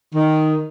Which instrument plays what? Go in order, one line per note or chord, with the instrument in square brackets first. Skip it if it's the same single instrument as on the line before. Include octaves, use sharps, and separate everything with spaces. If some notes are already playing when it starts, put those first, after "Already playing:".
[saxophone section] D#3